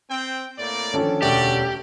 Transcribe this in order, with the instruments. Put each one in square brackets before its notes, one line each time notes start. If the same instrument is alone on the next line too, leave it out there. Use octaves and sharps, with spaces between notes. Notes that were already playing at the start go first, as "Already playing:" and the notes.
[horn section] C4 G5
A2 A#3 D5
[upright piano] D3 D#3 F3 [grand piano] C#4 A4
[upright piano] E1 D2 E5 [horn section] G3 F#4 D5 [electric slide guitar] G4